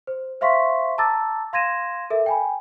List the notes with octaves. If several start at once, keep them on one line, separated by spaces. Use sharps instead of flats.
C5
C5 E5 F5 C6 C#6 B6
A5 A#5 D6 E6 A6
F5 C6 G#6 A#6 D#7 E7
A4 A#4 E5
G5 G#5 B5